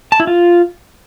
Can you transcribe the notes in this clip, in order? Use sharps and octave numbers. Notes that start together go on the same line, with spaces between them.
A5
E4
F4